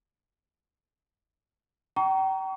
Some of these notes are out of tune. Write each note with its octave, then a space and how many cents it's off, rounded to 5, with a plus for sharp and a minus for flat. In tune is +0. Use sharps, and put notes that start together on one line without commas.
G5 -40 A#5 +0 C#6 +35